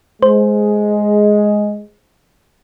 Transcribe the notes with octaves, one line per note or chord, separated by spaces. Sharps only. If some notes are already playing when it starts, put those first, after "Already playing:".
G#3 C5